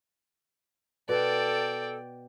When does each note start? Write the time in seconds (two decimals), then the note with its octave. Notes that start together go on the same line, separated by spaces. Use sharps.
1.09 B2 A4 D5 G5